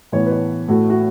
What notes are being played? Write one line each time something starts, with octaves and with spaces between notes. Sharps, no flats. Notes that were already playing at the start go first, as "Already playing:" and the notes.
A2 E3 B3 C#5
B4
C#5
A2 A3 F#4
F#4